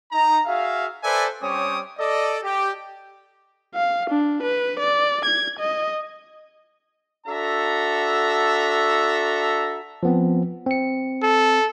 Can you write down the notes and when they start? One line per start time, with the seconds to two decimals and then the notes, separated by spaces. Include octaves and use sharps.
0.12 D#4 A#5
0.46 F#4 G#4 E5 F5
1.04 A4 B4 C5 D5 E5 G#5
1.42 G3 C4 C#4 C#5 D6 D#6
1.99 A4 D5 D#5
2.43 G4
3.74 F5
4.10 D4
4.43 B4
4.79 D5
5.25 G#6
5.59 D#5
7.27 D4 F#4 A4 E5 A#5
10.03 F3 B3 C4
10.66 C4 C#7
11.22 A4